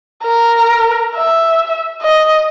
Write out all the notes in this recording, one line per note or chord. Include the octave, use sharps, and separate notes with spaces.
A#4
E5
D#5